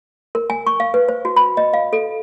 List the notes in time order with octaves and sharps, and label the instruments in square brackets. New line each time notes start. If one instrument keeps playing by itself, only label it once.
[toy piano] A#4
G#5
C#6
F5
B4
C5
F#4
B5
D#5
F5
A4